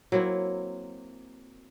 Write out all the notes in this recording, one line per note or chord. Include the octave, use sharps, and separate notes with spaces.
F#3 A#3 C4 E4